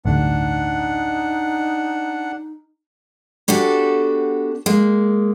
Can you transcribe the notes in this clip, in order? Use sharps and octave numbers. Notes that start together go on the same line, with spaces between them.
A1 D2 G2 D4 D#4 F#5
B3 D4 F#4 G4 A4
G#3 A#3